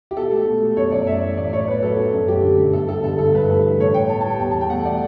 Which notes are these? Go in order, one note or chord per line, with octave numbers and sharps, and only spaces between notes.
G4
B2 A4
A3
B2
A3
F#2 C#5
F#2 D5
A3 E5
E3
A2 D5
A2 C#5
B3 B4
F#3 A4
F#2
F#2
A3 G4
D3
G2
B3 A4
G3 A4
D3 A4
G2 A4
G2 B4
A3 A4
E3
A2 C#5
A2 G5
B3 A5
A5
G3
E2 G5
A5
E2
G5
A3 F#5
B2 D5